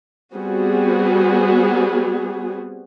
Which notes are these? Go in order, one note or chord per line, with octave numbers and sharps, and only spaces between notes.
G3 B3 C4 F#4 G#4